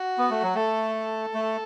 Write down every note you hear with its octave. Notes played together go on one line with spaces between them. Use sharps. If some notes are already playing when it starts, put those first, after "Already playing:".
Already playing: F#4
B3
A3
F#3
A3 A4
A3